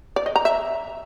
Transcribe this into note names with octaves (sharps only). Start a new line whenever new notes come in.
D5
D#5
A#5
E5